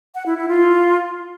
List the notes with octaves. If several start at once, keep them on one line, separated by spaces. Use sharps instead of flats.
F#5
E4
E4
F4